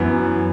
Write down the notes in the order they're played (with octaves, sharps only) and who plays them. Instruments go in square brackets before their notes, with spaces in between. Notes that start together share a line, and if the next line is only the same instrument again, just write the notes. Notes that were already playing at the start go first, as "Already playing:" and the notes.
Already playing: [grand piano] F#2 E3 B3